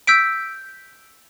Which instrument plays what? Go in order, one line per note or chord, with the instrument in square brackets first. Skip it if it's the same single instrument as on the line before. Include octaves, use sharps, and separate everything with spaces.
[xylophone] E6 G6 B6 D7